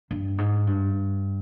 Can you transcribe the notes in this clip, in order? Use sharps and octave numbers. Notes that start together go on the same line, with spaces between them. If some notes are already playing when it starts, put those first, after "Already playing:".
G2
G#2
G2